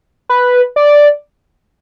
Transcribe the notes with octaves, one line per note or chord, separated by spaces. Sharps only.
B4
D5